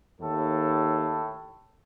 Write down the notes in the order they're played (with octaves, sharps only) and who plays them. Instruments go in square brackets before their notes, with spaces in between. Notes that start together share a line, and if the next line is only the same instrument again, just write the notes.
[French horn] D#2 [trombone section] A2 A4